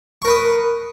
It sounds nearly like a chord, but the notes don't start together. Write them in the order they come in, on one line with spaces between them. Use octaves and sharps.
C#6 A#4 B4 D#6